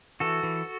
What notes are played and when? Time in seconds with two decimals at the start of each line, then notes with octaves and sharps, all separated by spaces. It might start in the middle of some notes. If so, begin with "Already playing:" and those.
0.20 E3 F#4 A4
0.43 E3